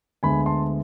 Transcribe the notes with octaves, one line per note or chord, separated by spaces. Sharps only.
D2 D3 G#3 B3 G#5 B5
A5 C6